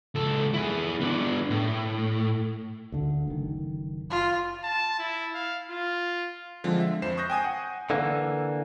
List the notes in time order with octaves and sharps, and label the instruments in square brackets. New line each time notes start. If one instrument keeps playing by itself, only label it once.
[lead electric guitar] C#2 A4
E4 G#4
B3 D4
A2
[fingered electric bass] D2 D3
F#1 D#3
[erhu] F4
[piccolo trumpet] A5
E4
F5
F4
[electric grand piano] D3 F3 G#3 C4
E5
F2 C5 C7 E7
C#6 D#6 F#6 G6 A#6
G5 G#5 D#6 D#7
F#5
[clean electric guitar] D3 E3 A#3